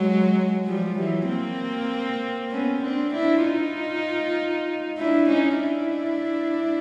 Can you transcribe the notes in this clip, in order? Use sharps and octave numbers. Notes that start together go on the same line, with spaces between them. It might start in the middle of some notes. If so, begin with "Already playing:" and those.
Already playing: F#3 G#3
F3 G3
E3 F#3
A#3 C4
B3 C#4
C4 D4
D4 E4
D#4 F4
D4 E4
C#4 D#4
D4 E4